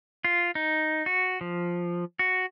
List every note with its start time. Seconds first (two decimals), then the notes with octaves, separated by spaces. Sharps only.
0.25 F4
0.55 D#4
1.06 F#4
1.41 F3
2.19 F#4